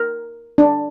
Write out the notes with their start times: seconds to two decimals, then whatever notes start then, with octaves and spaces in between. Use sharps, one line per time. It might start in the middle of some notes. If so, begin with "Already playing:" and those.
Already playing: A#4
0.58 D4